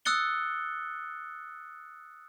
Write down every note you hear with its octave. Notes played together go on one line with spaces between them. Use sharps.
D#6 E6 F#6 A6 C#7 G7